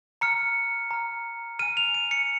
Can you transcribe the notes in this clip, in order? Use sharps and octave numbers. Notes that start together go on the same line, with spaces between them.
A#5 F6 C#7
A#5 F6
G#5 F6 D#7
F7
D#7
C#7